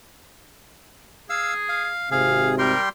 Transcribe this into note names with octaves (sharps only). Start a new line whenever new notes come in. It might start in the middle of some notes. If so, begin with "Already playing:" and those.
G#4 F5 E6
F5
G#1 C3 G#4 F5
G3 G4 A#4 C6